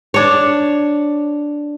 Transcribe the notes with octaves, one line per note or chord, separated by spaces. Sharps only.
D4 C#5